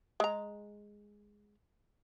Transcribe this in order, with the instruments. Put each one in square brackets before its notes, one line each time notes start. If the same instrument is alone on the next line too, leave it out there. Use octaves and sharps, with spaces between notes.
[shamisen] G#3 A#5